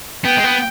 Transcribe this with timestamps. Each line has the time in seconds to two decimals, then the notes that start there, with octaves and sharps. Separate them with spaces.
0.25 B3 G5
0.37 G#3
0.44 B3